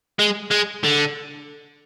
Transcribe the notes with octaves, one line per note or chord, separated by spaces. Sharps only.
G#3
G#3
D3